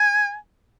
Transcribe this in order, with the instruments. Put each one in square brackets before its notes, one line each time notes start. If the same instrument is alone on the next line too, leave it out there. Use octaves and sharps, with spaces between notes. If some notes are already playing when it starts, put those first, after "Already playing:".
Already playing: [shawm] G#5